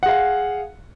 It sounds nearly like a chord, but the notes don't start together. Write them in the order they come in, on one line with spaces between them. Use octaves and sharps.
F#5 G#4 F5